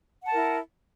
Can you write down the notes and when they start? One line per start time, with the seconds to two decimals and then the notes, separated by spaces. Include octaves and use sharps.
0.22 F#5
0.26 A5
0.30 A#4
0.34 E4